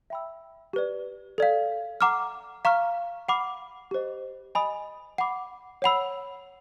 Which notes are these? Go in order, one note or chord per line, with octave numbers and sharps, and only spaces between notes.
E5 G5 B5 E6
G4 B4 D5
A4 D5 F5
F#5 A#5 D6 F6
F5 A#5 C#6 F6
F#5 B5 D6 F6
G4 C5 D#5
D#5 G#5 B5 D#6
F#5 B5 D6
C#5 F#5 B5 E6